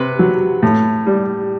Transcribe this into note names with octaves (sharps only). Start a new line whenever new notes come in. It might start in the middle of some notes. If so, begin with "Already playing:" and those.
Already playing: C3 B4
F#3
A2
G3